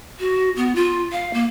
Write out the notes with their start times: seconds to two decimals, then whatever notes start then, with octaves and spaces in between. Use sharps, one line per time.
0.20 F#4
0.56 B3
0.75 F4
1.12 F5
1.34 A#3